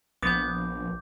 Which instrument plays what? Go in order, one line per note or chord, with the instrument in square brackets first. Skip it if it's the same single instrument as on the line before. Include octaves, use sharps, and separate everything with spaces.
[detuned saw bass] A#1 [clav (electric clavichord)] B3 [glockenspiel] D6 G6